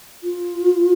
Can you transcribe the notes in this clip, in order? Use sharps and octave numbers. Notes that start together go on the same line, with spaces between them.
F4